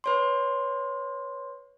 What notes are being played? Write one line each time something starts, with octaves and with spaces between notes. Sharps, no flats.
B4 C#5 C6